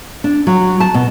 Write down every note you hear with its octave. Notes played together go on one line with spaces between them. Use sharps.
D4
F#3
A5
B2